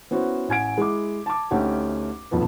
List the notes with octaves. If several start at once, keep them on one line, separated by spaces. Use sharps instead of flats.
B3 C#4 E4 F#4 C5
A1 G#5 G#6 D7
G#3 E4 D6
A5 D6
D2 A3 C#4 D#4 G4
D#1 B1 F2 F3 B4